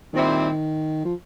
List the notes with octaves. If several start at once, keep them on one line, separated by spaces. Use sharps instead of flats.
A#2 D#3 G3 C4 E4
F3